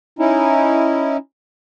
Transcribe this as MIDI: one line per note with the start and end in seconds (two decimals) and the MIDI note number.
0.19 1.17 61
0.19 1.17 63
0.19 1.17 64